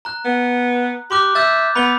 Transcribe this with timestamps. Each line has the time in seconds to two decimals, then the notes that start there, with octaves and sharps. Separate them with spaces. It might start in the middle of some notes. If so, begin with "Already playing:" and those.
0.05 A#5 F#6
0.25 B3
1.11 G4 C6 D6 F#6
1.35 E5 E6 G6 A6
1.75 B3 B5 G7